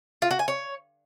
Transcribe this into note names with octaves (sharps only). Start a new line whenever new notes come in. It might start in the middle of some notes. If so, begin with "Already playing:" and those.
F4
F#4
G#5
C#5